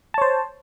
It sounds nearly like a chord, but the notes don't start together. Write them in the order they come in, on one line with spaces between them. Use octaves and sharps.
A5 C#5 C5